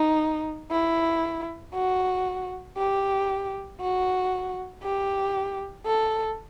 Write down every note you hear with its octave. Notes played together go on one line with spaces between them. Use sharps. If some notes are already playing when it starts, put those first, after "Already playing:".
Already playing: D#4
E4
F#4
G4
F#4
G4
A4